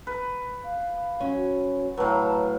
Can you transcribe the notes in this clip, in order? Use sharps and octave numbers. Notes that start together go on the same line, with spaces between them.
B4
F5
F#3 C#4 C#5
F#4
A2 F#3 B4 F5 A5